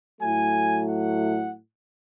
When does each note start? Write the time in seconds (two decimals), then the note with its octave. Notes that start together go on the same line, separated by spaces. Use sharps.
0.20 A2 F#3 A3 G#5
0.88 F#5